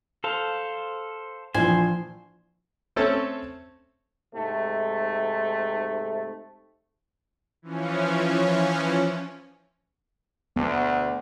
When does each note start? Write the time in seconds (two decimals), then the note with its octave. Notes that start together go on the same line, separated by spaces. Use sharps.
0.24 A4 C5 F5
1.54 A#1 E3 F3 C5 G#5
2.96 A3 C4 C#4 A4
4.32 G#2 C3 A3
7.62 E3 F3 C#4
10.56 D2 B3